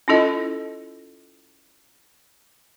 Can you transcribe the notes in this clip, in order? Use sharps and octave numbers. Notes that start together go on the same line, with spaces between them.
C#4 E4 F4 A4 D#5